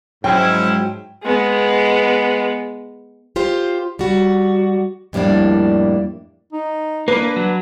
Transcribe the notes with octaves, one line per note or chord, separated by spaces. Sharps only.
G#2 F3 F#3 C#4 E4 G5
G#3 B3
F4 G4 C5
G3 F#4
F2 A2 G3 A#3 D4
D#4
A#3 D4 B4
F#3